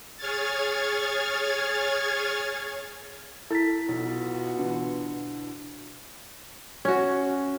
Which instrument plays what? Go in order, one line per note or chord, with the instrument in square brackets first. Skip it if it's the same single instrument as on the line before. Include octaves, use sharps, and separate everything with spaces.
[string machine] G#4 C#5 F6 G#6 A6
[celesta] E4 B6 [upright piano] A4 A6
[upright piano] B1 [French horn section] B3 F4 F#4
[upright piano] B2 D3 E3
[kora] C#4 F#4